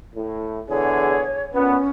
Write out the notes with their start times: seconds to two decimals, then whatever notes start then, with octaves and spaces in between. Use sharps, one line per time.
0.14 A2
0.69 E2 D3 G#4 C#5
1.53 A#2 B3 C#4